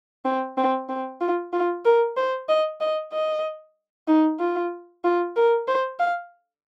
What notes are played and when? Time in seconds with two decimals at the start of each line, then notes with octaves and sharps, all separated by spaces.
0.25 C4
0.57 C4
0.89 C4
1.21 F4
1.53 F4
1.85 A#4
2.17 C5
2.49 D#5
2.81 D#5
3.13 D#5
4.08 D#4
4.40 F4
5.04 F4
5.36 A#4
5.68 C5
6.00 F5